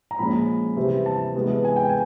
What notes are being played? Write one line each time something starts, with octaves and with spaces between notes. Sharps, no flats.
A#5
A#2 F3 G#3 C#4 B5
C3 E3 G3 C4
A5
C3 E3 G#3 B3
G#5
G5
G#5